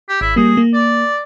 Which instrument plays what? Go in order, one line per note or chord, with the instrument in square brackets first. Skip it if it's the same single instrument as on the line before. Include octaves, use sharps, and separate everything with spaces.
[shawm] G4
[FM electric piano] G#1 [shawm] E4
[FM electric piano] G3 A#3 [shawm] G#4
[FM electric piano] A#3
[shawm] D5